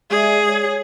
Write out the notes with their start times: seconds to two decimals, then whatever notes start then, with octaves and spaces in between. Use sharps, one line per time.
0.11 G#3 G#4 D5 E5
0.49 C#5